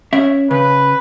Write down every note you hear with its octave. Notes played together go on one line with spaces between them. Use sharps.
C#4 E5
C#3 B4